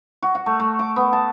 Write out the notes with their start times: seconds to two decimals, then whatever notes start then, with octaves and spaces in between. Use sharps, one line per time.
0.22 F#4
0.35 F#5
0.46 A3
0.60 A3
0.79 D6
0.96 B3
1.13 A5